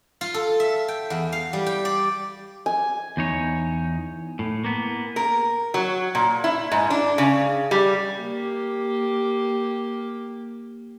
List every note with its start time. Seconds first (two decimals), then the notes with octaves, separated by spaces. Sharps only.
0.21 F4
0.34 A4
0.60 E5
0.88 G5
1.10 E2
1.32 F5
1.53 G3
1.66 G5
1.85 D5
2.66 G#5
3.17 E2 D#4 C#5
4.39 A2
4.64 A#3 B3
5.16 A#4
5.74 F#3
6.15 A#2
6.44 E4
6.72 G#2
6.90 D4
7.18 C#3
7.71 G3
8.21 A#3 G4